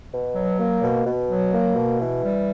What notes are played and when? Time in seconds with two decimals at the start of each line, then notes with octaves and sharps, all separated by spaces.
0.13 B2
0.36 F#3
0.59 A#3
0.82 B2
1.05 B2
1.29 F#3
1.52 A#3
1.75 B2
1.99 E3
2.22 G3